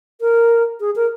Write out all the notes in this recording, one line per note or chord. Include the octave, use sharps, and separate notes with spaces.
A#4
G#4
A#4